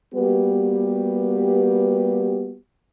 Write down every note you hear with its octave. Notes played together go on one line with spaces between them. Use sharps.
G3 A#3 B3 F#4 G4 B4